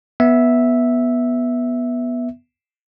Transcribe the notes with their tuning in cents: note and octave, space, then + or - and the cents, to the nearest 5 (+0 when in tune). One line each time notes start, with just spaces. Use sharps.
B3 -10 E5 -5